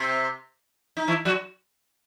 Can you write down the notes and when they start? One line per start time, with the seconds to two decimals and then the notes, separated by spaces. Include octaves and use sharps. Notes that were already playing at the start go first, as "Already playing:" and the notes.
Already playing: C3 C4
0.97 D#4
1.08 E3 E4
1.25 F#3 F#4